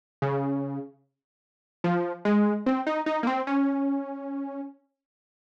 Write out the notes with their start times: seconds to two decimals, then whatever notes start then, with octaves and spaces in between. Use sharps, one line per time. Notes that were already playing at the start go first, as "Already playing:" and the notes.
0.22 C#3
1.84 F3
2.25 G#3
2.66 C4
2.87 D#4
3.06 D#4
3.23 A#3
3.27 C4
3.47 C#4